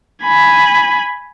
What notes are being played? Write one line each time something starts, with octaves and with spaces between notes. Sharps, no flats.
G#5 B5